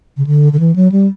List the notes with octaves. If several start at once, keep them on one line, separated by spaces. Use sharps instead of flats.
C#3
D3
D3
E3
F#3
G3